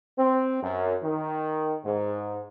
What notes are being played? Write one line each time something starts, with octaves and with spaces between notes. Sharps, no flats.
C4
F#2
D#3
G#2